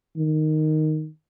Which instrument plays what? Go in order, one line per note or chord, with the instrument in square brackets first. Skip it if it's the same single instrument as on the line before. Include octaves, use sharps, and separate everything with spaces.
[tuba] D#3